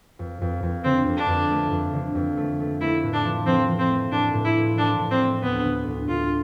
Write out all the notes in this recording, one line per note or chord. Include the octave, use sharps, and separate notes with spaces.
F2
F2
F2
D3 C4
F2
D4
F2
A3
F2
D3
F2
A3
A3
A3 E4
A2
D4
F3
F3 C4
F3
C4
A3
A2 D4
A2
E4
F3
F3 D4
A2
C4
A3
D2 B3
D2
D2
D2 F4